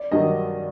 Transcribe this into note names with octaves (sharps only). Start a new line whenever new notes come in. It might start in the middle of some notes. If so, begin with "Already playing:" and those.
Already playing: D5
G2 D#3 F#3 D#5